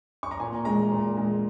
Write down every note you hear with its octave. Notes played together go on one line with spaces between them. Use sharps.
C#6
A#5
A#2 G#5
G#3 A#5
A#2
G#3